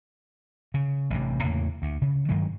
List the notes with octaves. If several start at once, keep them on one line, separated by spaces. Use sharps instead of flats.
C#3
A1 G2 C3
E2 A2 C#3 A#3
D2
C#3
G2 D#3 F#3 G#3